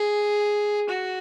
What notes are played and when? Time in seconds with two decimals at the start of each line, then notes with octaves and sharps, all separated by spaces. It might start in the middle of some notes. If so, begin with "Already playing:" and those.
Already playing: G#4
0.89 F#4